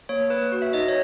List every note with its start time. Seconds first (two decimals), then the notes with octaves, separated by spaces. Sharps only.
0.09 A#3 C#5
0.30 A#3 B4
0.52 F#4
0.62 E5
0.73 D#4 D#5
0.88 C#5